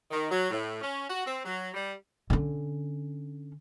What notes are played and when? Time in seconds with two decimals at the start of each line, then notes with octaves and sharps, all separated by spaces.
0.11 D#3
0.30 F#3
0.50 A2
0.82 C#4
1.10 F#4
1.25 C4
1.45 F#3
1.74 G3
2.30 D3 C#4